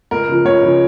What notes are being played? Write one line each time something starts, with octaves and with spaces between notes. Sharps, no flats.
C#2 A#4
C#3 F3
C#2 C#5
C#3 F3